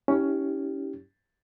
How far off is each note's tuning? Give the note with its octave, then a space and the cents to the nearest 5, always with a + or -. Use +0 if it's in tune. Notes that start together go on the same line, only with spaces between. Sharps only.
C#4 +10 E4 -30 G4 +0